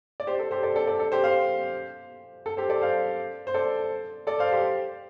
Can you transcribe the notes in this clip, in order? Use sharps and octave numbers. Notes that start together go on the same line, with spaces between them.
D5
G4 C5
A4
G4 C5
A4 D5
A4 D5
A4 D5
A4
G4 C5
C5 F5
A4
G4 C5
A4 D5
C5 F5
C5
A4 D5
A4 D5
C5 F5
G4 C5